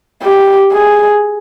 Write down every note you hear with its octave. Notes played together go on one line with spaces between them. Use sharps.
G4
G#4